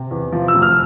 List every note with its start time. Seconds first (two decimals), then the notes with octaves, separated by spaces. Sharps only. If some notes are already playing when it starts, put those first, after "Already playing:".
Already playing: C3
0.11 E2
0.32 F3
0.48 E6
0.54 F1
0.62 F6